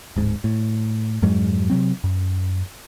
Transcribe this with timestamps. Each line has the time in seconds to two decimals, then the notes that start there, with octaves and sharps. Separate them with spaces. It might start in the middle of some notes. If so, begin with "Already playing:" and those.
0.16 D1 G#2
0.44 A2
1.22 F2 G#2 F#3 G#3
1.70 C3 E3 F#3 C4
2.04 F#2